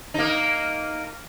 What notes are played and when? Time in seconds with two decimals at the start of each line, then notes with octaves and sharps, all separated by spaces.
0.14 A#3 D#4